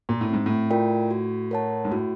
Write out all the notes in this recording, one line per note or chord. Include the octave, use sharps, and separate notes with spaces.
A#2
A2
G#2 C4
A2
F4 A#4 D5 G5
F#4
A#4 C#5 F#5 A5
G#2
A2 F#4